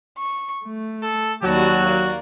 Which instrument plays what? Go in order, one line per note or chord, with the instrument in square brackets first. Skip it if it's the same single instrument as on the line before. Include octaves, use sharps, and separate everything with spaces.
[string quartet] C#6
A3
[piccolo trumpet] A4
[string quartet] D#2 G3 A5 [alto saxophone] F#3 [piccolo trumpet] F#4
[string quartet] A#3 D5